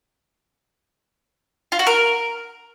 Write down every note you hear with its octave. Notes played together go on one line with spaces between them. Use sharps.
F4
F#4
A#4